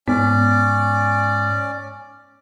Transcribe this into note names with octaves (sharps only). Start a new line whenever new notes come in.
G#2 B3 C#4 D5